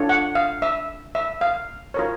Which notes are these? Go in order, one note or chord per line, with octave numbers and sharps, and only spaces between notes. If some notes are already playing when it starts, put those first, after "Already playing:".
Already playing: D4 F4 A4 C#5
F#5
F5
E5
E5
F5
F4 A#4 C#5